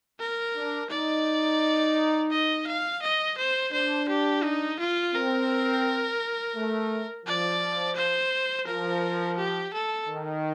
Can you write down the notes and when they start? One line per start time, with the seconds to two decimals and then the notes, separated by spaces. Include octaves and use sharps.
0.20 A#4
0.56 D4
0.91 D#4 D5
2.31 D#5
2.67 F5
3.02 D#5
3.38 C5
3.73 D4 C5
4.09 G4
4.44 D#4
4.80 F4
5.14 C4 A#4
6.56 A3
7.26 F3 D5
7.96 C5
8.67 F3 A#4
9.38 G4
9.73 A4
10.08 D#3